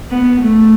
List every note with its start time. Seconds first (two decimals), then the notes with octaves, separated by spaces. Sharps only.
0.11 B3
0.41 A3